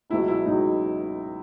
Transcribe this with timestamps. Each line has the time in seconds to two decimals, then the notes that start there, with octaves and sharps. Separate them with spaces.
0.10 C#2 B2 F#3 E4
0.28 E4
0.45 C#2 B2 F#3 D#4